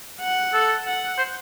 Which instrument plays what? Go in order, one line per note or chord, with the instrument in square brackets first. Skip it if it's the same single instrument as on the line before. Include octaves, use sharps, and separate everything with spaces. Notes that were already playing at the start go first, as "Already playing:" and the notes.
[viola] F#5
[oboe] A4
[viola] F#5
[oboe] C5